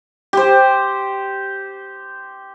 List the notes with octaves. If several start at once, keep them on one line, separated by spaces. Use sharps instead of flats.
G4 C5